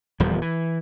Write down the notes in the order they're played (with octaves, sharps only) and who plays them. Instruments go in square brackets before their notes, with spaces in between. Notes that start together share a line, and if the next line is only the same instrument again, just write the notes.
[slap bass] D#1 E2 F3 G3
E3